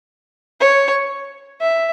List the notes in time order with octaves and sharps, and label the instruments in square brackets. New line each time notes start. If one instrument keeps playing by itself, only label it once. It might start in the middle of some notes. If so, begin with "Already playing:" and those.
[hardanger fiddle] C#5
E5